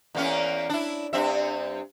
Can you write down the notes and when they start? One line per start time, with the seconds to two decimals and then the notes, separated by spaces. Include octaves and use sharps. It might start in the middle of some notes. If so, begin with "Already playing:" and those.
0.15 E2 A#3 C#4
0.69 D4 E4
1.13 G2 C4 E5